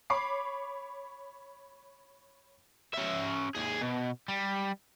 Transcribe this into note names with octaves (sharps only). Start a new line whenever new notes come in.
C#5 B5 C#6 D6 C7
C#4 E5
D#2 G#4
B2
G3